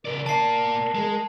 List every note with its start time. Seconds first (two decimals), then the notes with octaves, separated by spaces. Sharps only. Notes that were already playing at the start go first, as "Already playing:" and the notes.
0.05 C#3 A#4 D5
0.26 A#3 D5 A5 C7
0.95 G#3